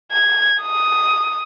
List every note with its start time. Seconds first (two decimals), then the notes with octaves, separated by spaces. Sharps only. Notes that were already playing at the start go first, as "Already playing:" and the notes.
0.12 G#6
0.61 D#6